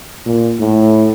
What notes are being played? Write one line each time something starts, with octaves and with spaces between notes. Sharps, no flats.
A#2
A2